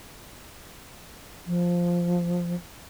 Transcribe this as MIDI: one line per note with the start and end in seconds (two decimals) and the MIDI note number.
1.46 2.55 53